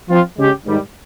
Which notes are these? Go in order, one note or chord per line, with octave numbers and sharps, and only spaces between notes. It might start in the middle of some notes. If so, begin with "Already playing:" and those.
F3 C4 F4
C#3 G#3 C#4 G4
G#2 D#3 G3